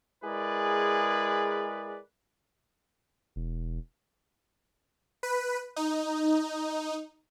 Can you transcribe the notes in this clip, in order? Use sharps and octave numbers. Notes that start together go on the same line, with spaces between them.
G#3 E4 G#4 A#4 B4 D5
E1
B4
D#4